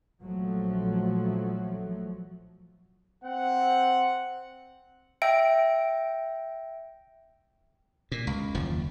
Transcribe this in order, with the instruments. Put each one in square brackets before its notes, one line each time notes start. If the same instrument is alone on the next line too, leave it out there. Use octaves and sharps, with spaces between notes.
[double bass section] A#1 F3 F#3 A3
[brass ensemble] C4 F#5
[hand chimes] E5 G5 D7
[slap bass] A#2
C#2
F#1 D#2 F3